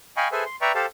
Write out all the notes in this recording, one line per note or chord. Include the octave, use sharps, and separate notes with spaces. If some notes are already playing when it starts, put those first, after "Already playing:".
D#5 F5 G5 G#5 B5 C#6
G#4 A4 B4 C5 E5 G#5
C6
B4 D5 E5 G5 A#5 C#6
G4 A4 C5 F5 A5